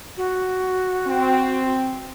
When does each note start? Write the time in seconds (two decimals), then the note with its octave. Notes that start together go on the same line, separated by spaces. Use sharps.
0.17 F#4
1.06 C4